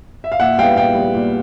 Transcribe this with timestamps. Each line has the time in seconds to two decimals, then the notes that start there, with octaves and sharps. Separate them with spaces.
0.24 E5
0.32 F5
0.40 A#2 E5 F#5
0.59 G3 B3 F5 G5
0.76 A#2 F5 G5
0.95 G3 B3
1.14 A#2